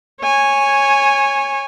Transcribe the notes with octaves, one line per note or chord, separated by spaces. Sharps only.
C#5 G#5